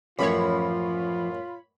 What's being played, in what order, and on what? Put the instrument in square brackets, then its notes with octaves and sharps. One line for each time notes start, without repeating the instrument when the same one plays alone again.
[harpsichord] A1 F#2 [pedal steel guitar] F3 [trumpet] F4 [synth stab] C#5 B5